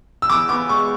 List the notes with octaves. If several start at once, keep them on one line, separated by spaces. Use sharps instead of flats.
E6
E2 D6
B3 D6
G#3 C#6